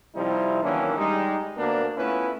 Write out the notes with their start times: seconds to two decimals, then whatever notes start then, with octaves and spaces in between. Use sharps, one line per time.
0.15 C3 F3 G3 D#4 E4
0.63 D#3 E3 F#3 A#3 C#4 D4
0.97 G3 G#3 D#4
1.57 D2 A#3 B3 D4 A#4
1.98 A3 B3 C#4 E4 F4 B4